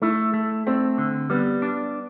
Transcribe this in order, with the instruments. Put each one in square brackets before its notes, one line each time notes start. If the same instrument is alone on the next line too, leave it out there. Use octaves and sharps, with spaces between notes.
[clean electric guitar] A3 [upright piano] E4
[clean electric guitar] A3
[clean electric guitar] A3 [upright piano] C4
[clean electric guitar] D3
[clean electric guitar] G3 [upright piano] B3
[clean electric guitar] D4